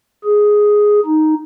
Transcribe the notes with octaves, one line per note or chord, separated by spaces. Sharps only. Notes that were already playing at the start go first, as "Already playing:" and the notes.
G#4
D#4